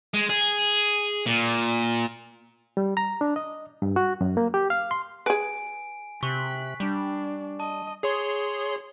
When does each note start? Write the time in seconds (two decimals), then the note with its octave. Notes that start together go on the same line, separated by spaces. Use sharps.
0.14 G#3
0.29 G#4
1.26 A#2
2.77 G3
2.97 A#5
3.21 D4
3.36 D#5
3.82 G2
3.96 F#4
4.21 F#2
4.37 A#3
4.54 G4
4.70 F5
4.91 C6
5.26 G#4 B4 G#5 D7
6.23 C3 C#6 F#6 B6
6.80 G3 D4
7.60 D#5 A5
8.03 G#4 C#5 C6